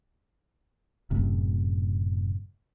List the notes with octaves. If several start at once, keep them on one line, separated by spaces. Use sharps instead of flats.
F#1 F#2 A2 C3